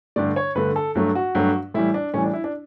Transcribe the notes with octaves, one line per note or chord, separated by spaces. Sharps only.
G2 D3 A3 D5
C#5
G2 D3 A3 B4
A4
G2 F#3 A3
F#4
G2 F#3 A3
A2 E3 G3 E4
D4
A2 E3 G3 C#4
D4
E4
D4